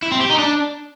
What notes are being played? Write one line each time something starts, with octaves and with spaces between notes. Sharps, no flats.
E4
C4
G4
D#4
D4